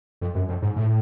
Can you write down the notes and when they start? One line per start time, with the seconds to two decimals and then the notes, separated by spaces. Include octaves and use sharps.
0.21 F2
0.35 F#2
0.49 F2
0.62 G#2
0.76 A2